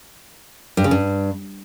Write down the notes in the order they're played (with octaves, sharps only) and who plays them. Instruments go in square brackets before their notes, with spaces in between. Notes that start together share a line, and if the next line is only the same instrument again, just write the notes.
[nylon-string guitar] G2
C#3
G2